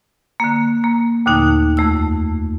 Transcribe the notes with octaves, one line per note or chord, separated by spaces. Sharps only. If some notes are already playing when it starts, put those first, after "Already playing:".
D3 A#3
A#3
D#2 A#2 D3 A3 D#4 G5
F2 A3 E6